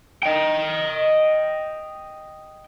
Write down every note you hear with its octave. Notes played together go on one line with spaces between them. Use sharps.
D#5 G5